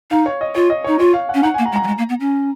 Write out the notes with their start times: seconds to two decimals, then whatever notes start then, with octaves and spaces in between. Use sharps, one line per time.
0.11 D#4 F5
0.26 C#5
0.41 D#5
0.55 F4 C#5
0.70 D#5
0.84 D#4 C#5
0.99 F4 C#5
1.14 F5
1.29 F#5
1.34 C#4
1.43 D#4 F#5
1.54 A#3 G#5
1.66 A#5
1.72 G#3
1.76 A#5
1.84 F#3
1.87 G#3
1.98 A#3
2.09 B3
2.20 C#4